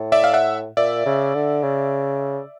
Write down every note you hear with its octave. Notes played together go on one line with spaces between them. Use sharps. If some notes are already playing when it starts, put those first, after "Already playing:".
Already playing: A2
D5 E5
F5
E5 F#5
A#2 D5 E5
C#3
D3
C#3